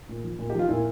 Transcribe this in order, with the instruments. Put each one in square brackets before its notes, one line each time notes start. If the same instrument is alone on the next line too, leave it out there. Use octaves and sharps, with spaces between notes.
[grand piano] A#2
F3
A#2
G4
F3 F4
A#2 E4